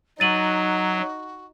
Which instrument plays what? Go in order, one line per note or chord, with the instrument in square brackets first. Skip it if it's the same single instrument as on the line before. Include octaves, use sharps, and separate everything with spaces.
[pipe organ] F#3 [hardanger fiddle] D#4 [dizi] F#4 [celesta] A6 D#7 F#7